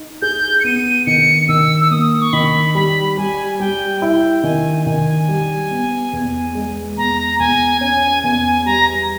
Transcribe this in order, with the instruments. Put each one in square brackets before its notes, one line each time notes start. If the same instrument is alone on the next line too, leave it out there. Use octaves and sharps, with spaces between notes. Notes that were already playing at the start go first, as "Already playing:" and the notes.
Already playing: [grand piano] D#4
[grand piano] G#4 [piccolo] G6
[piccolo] C#7
[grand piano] B3 [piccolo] D#7
[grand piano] D#3 [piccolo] C#7
[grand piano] D#3 [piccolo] E6
[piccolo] E6
[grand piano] A#3 [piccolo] D#6
[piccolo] C#6
[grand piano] D#3 [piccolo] B5
[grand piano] G3 [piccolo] B5
[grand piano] G3 [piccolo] G#5
[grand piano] G3 [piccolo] G5
[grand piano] E4 [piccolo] G5
[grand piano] D#3 [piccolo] G#5
[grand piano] D#3 [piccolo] G#5
[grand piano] G3
B3
E2
G#3
[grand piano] E2 [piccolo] A#5
[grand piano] E2 [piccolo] G#5
[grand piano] C#4 [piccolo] G#5
[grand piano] E2 [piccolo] G#5
[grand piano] G3 [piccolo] A#5